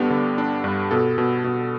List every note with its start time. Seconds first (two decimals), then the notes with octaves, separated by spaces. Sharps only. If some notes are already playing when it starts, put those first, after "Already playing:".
Already playing: G2 D3 B3 D4 G4
0.10 D3
0.38 D4
0.64 G2
0.91 B2 A4
1.18 B2
1.44 B2